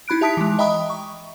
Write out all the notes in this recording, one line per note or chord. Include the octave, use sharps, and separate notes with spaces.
D#4 E4 B5 F#6 D7
G4 E5 A5 D#6 B6 D7
E3 G#3
D#5 E5 G5 A#5 B5 D#6
C#6